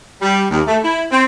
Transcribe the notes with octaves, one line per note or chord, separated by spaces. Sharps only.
G3
D#2
A3
E4
C4